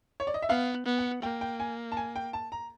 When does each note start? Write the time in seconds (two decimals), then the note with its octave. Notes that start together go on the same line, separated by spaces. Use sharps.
0.20 C#5
0.27 D5
0.34 D#5
0.42 E5
0.49 B3 F5
0.86 B3
0.98 F#5
1.22 A#3 G5
1.41 G5
1.60 G#5
1.92 A5
1.97 G#5
2.16 G5
2.33 A5
2.52 A#5